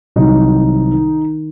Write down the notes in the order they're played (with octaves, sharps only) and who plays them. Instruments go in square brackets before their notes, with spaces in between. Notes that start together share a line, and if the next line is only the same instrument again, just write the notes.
[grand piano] C2 C3 D#3 F#3 D#4
D#3